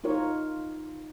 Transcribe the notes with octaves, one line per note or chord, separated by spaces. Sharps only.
D#4 F4 A#4 C#5